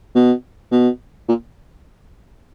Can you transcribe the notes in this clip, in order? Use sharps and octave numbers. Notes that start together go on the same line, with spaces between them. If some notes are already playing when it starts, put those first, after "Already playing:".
B2
B2
A#2